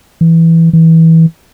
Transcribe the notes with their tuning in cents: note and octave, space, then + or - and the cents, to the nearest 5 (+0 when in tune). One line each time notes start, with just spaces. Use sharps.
E3 +0
E3 -20